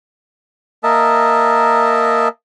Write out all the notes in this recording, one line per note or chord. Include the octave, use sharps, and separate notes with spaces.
A#3 A#4 D#5 E5 A5